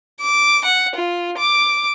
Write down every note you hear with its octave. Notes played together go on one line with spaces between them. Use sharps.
D6
F#5
F4
D6